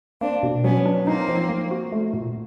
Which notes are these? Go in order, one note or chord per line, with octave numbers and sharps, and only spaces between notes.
A#3 C4 D4
B2
F#3 B3 C#4
D4
A#3 C4 D#4
F3
A#3
F#4
A3
A#2